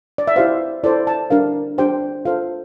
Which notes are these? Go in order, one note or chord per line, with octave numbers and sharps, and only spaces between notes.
D5
E5
E4 G4 C5 F5
E4 A4 C5 D5
A5
D4 G4 A#4 F5
D4 G4 C5 G5
F4 A4 C5 F5